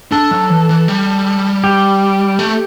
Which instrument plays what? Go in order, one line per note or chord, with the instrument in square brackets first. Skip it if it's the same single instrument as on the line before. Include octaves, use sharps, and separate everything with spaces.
[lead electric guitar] D4 [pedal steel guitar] A4
[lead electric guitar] F#3
E3
E3
G3
[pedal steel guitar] G4
[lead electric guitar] A3